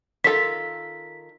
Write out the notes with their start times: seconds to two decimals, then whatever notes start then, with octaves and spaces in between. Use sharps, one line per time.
0.24 D#3 F4 A4 B6